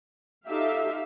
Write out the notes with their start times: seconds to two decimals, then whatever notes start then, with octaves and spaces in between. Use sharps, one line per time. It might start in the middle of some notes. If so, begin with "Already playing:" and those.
0.47 D#4 F4 G4 A4 E5 F5